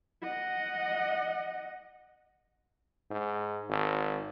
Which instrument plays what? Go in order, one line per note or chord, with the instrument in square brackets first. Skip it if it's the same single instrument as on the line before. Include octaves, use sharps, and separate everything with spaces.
[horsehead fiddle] D#5 F#5
[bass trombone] G#2
G#1